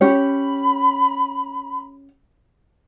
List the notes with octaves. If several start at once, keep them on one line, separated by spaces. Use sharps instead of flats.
C#4 G4 C#5 B5